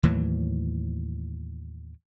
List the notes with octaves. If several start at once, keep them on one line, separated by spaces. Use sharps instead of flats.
D#2 A2 E3 F#3